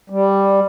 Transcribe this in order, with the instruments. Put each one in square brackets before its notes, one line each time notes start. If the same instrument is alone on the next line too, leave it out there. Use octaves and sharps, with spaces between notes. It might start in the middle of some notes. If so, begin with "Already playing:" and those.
[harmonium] G3